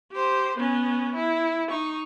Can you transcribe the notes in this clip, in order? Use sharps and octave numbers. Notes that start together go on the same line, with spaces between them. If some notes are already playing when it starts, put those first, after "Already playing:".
G4 C5
B3 C#4
E4
D#4 C#6